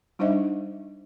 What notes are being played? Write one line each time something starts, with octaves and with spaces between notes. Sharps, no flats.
G3 D4 D#4 C5 D#5 E5